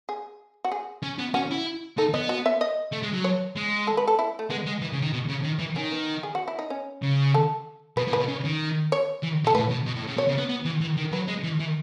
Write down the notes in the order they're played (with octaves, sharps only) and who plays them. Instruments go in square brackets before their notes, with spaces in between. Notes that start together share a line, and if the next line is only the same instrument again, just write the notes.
[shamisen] G#4
F#4
G#4
[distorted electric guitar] C#4
B3
[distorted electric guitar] C#4 [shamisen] F#4
[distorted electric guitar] E4
[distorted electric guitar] D#4 [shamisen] A4
[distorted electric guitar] B3 [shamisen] D#5
[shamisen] F#4
E5
D#5
[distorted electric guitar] A3
G#3
F#3
[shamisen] C#5
[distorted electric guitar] G#3
[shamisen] A4
B4
A4
E4
A3
[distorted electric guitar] G#3 [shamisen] B3
[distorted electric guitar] G#3
E3
C#3
D#3
B2
C#3
D#3
E3
[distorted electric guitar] D#3 [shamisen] C#4
[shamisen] B3
G#4
F#4
E4
D#4
C#4
[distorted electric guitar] C#3
[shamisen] A4
[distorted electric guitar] B2 [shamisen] B4
[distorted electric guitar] A2
[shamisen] B4
[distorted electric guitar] B2
C#3
D#3
[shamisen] C#5
[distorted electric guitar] E3
[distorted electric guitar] B2 [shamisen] A4
[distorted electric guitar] A2 [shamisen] B4
[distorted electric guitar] B2
B2
A2
C#3
[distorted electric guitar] B2 [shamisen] C#5
[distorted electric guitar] C#3
B3
B3
E3
E3
D#3
[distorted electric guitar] F#3 [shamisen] B4
[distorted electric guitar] G#3
E3
E3